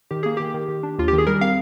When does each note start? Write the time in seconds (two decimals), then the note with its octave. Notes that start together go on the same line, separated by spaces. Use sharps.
0.11 D#3 G4
0.23 A#3 G#4
0.37 D#3 G4
0.54 D#3
0.68 D#3
0.83 D4
0.98 D#2 F4
1.08 G4
1.13 D#3
1.18 G#4
1.27 G3 A#4
1.41 C4 F5